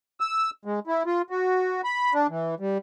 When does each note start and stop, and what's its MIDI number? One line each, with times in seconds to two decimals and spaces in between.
0.20 0.50 88
0.65 0.80 56
0.87 1.03 64
1.06 1.22 65
1.30 1.81 66
1.84 2.14 83
2.14 2.27 62
2.29 2.55 52
2.60 2.78 55